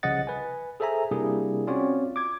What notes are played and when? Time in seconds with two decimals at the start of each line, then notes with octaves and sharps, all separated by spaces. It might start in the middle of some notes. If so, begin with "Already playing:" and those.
0.03 C2 C#3 F3 D#5 F#5 A6
0.27 B4 G#5
0.80 G#4 A4 C5 E5 G#5 A#5
1.11 C3 G3 A#3 D4 E4 G#4
1.67 C4 C#4 F4 F#4 C#5 D5
2.16 D6 G#6